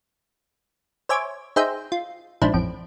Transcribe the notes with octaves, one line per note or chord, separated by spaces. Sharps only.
C5 C#5 E5 G#5 D6
D#4 G#4 C5 E5 G5
F4
A#1 G#2 D4 E4 C5
A1 F2 D7